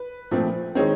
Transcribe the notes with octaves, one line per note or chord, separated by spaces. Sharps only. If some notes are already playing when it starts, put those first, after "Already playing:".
Already playing: B4
A#2 F3 A3 C4
D#3 G#3 C4 C#5